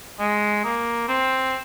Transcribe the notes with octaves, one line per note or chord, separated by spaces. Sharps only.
G#3
A#3
C4